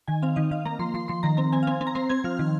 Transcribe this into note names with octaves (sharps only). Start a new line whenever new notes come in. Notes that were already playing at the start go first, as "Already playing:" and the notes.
D#3 G#5
C4 F5
D#3 D#5
D#3 F5
A#3 A#5
F3 C6
F3 C6
F3 C6
D#3 A#5
C4 A#5
C4 G#5
F5
C4 G#5
C4
A#5
C4 C6
C4 G#6
F3 F6
D#3